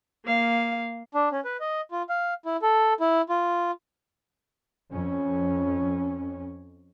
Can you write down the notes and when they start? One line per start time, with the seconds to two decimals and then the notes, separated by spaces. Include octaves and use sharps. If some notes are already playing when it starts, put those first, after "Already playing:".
0.25 A#3 F5
1.14 D4
1.32 C#4
1.45 B4
1.60 D#5
1.91 F4
2.09 F5
2.45 E4
2.62 A4
3.00 E4
3.29 F4
4.92 F2 C#4